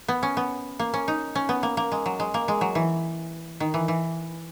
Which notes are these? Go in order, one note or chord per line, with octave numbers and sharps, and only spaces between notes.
B3
C#4
B3
A#3
C#4
D#4
C#4
B3
A#3
A#3
G#3
F#3
G#3
A#3
G#3
F#3
E3
D#3
E3
E3